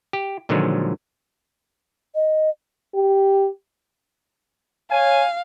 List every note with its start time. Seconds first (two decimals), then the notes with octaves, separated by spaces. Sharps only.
0.13 G4
0.49 A#2 D3 D#3 F3 F#3 G#3
2.15 D#5
2.95 G4
4.91 C#5 F5 G#5